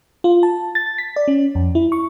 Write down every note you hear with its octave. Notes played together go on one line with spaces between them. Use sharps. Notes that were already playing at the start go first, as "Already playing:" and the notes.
F4
A5
A6
B6
D5
C#4
F2
E4
C#6